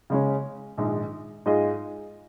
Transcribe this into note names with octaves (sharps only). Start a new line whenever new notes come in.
C#3 G#3 C#4
A#1 G#2 D#3 G#3
G#2 G#3 F4 G#4 D#5